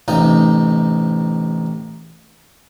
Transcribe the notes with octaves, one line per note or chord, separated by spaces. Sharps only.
A1 C3 D#4 D#6